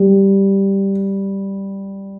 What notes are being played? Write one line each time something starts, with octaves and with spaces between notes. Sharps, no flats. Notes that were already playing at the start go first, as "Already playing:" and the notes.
Already playing: G3